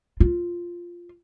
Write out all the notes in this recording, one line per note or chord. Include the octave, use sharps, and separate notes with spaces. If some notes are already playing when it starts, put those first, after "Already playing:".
F4